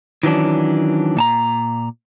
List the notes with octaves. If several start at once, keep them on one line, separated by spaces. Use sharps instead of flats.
D#3 E3 F#3 C#4 D4
A#2 A5 A#5